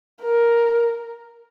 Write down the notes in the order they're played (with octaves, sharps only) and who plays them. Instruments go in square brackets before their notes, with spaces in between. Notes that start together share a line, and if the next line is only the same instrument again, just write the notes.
[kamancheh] A#4